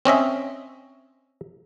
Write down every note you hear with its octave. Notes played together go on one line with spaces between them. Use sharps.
C4 C#4 D#5 E5